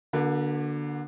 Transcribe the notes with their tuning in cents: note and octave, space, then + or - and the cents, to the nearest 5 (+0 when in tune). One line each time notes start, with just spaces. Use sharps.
D3 +0 A#3 +45 F#4 -15